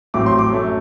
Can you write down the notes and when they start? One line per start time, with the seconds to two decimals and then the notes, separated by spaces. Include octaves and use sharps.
0.14 A1 A2 F#3 C4 D6
0.26 C6
0.39 D6
0.52 F#2 F#3 A3